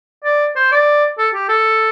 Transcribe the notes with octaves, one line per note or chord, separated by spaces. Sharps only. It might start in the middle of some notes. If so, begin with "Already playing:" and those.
D5
C5
D5
A4
G4
A4